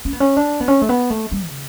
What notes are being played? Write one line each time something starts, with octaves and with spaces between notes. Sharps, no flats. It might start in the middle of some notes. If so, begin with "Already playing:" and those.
C#4
B3
C#4
D4
B3
C#4
A3
B3
A3
G3
C#3